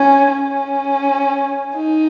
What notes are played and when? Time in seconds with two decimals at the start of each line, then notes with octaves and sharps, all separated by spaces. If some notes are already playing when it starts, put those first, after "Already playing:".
Already playing: C#4
0.32 C#4
1.76 D#4